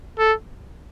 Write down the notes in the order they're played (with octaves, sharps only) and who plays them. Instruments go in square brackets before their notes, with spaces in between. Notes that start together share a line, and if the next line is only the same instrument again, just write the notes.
[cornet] A4